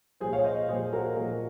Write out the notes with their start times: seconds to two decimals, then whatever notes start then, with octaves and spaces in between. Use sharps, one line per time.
0.20 A#2 F3 G#4 C5
0.33 C#5 F5
0.44 C5 D#5
0.68 A#2 F3 G#4 C5
0.93 F#4 A#4
1.16 A#2 F3 F#4 A#4